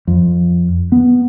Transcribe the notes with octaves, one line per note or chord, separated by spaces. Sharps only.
F2
B3